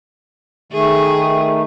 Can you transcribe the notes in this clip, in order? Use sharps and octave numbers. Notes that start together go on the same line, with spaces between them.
D#3 A3 G#4